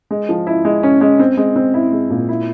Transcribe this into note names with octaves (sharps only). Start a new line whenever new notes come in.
G#3
F3
E4
G#3
C#4
G#3
C4
G#3
C4
E4
G#3
A#2
E4